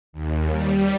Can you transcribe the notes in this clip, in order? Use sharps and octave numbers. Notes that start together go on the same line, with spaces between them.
D#2
G3